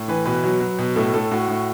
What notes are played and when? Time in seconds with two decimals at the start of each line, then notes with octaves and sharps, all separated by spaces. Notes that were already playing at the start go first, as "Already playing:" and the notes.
Already playing: A2
0.08 E3 B4
0.25 B2 B4
0.44 F#3
0.60 F#3
0.78 B2
0.95 A2 A4
1.13 A2 A4
1.31 A2 F#4
1.48 A2